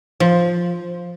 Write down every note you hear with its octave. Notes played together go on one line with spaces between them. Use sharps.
F3